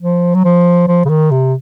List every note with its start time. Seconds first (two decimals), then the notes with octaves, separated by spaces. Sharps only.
0.02 F3
0.34 F#3
0.45 F3
0.88 F3
1.05 C#3
1.09 D#3
1.31 C3